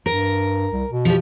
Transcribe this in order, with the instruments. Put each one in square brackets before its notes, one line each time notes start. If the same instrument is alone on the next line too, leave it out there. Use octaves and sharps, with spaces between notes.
[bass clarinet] G2 [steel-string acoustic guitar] A#4
[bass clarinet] C2
B2
[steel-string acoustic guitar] F3 G4